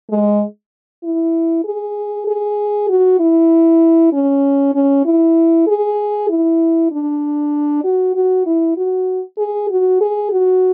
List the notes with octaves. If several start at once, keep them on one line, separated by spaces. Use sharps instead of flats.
G#3
E4
G#4
G#4
F#4
E4
C#4
C#4
E4
G#4
E4
D4
F#4
F#4
E4
F#4
G#4
F#4
G#4
F#4